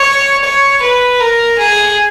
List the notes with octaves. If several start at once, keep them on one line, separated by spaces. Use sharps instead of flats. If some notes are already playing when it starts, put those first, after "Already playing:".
Already playing: C#5
C#5
B4
A#4
G#4